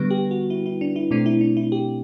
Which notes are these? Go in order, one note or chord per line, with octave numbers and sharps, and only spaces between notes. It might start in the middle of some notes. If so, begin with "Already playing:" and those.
Already playing: D3 G3 B3 B4
G4
F#4
E4
E4
D4
E4
B2 A3 C4 D4
E4
D4
E4
G4